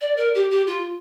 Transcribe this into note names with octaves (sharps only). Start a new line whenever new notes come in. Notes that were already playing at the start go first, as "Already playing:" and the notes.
D5
A#4
G4
G4
F4